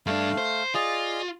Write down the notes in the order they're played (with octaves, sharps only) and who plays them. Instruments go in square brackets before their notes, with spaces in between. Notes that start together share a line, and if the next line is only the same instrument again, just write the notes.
[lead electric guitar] G2 D4 [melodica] A3 F5
[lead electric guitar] C5
[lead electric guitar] F4 [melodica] G#4 D5 D#5